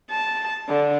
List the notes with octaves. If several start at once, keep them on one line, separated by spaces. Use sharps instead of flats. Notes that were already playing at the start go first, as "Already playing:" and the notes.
A5
D3